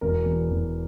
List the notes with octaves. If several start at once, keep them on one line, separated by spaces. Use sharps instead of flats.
E1 A#4
E2
E1